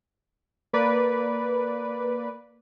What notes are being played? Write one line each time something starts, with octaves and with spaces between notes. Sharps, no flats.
A#3 B4 D5